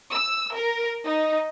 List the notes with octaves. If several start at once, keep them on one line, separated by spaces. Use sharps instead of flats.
E6
A#4
D#4